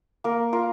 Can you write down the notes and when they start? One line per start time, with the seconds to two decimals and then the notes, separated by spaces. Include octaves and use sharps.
0.24 A#3 A#4
0.53 F4 A#4